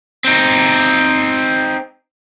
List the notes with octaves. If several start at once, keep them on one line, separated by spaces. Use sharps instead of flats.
C4 D#4